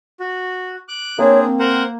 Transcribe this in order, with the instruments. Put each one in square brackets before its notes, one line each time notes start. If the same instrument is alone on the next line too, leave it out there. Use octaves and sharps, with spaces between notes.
[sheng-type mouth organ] F#4
D6 F#6
[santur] A#3 [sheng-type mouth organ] C4 D4 G#4 [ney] C#5
[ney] C4
[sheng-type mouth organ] A#4 C5 F#5